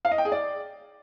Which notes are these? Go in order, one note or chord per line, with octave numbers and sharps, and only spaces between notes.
F5
D#5
G5
G#4
D5